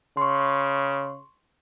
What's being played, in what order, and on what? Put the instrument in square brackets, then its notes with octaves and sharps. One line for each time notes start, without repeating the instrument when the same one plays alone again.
[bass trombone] C#3 [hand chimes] C6 C#6